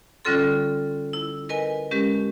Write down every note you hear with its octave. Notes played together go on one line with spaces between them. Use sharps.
D3 G3 C#4 F4 A4 C6
E4
A#4 B4 D#5 G#5
G#3 C#4 G4 A#4